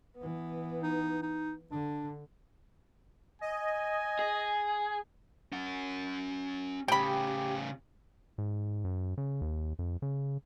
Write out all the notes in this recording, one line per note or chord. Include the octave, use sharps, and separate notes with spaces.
E3 B3
D#4
D#4
D3 D4
D#5 G#5
G#4
C#4 F#5
A2 C#3 G4 G5 B5
G#2
F#2
C#3
D#2
F2
C#3